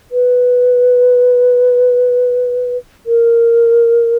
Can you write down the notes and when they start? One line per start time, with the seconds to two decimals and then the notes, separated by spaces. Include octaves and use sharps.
0.12 B4
3.06 A#4